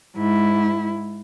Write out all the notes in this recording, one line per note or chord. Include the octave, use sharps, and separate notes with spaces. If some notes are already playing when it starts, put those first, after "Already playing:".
G#2 E4